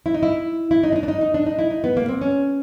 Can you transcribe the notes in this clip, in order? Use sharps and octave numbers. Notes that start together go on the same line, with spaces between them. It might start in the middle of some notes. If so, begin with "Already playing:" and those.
E4
D#4
E4
E4
D#4
D4
D#4
D4
D#4
D#4
D4
D#4
E4
D#4
B3
A#3
C4
C#4